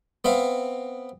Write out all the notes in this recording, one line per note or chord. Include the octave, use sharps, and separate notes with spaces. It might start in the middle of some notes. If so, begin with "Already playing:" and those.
B3 C4 E5 F5